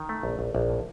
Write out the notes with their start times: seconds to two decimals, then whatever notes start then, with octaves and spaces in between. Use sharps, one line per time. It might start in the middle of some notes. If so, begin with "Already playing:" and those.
Already playing: D#3
0.09 A3
0.23 A#1
0.39 A#1
0.55 A#1
0.70 A2